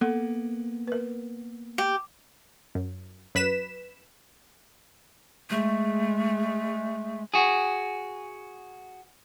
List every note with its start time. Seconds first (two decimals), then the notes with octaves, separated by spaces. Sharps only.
0.01 A#3 B3 A4 F#5
0.88 A#4 B4
1.78 G4
2.75 F#2
3.35 F#2 B4 B6 E7
5.50 G#3 A3
7.34 F#4 G#4